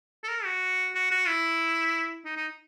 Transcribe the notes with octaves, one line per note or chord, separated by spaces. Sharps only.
A4
A#4
F#4
F#4
F#4
E4
D#4
D#4